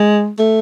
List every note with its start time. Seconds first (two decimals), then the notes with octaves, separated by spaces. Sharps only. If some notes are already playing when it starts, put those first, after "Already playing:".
Already playing: G#3
0.39 A3